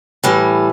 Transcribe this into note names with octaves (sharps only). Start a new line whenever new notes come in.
A2 E3 G3